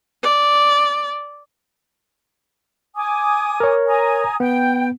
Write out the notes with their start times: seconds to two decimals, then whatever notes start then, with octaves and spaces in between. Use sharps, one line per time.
0.23 D5
2.96 G#5 D6 D#6
3.60 A#4 C#5
3.87 G#5 A#5 D#6
4.40 B3 G5